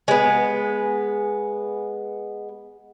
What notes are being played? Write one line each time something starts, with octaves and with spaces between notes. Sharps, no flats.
G#3 B3